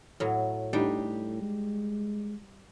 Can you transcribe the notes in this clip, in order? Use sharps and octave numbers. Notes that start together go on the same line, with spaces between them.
A2 F#3
A2 G3 D4 D#4 G4
G#3